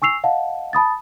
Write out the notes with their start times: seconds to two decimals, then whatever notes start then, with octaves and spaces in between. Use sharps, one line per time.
0.02 G#5 C#6 E6 C7 F7
0.24 D#5 F5 F#5 A5
0.73 A5 B5 D#6 A6